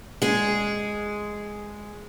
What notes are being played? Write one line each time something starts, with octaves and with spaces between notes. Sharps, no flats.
G#3 G#4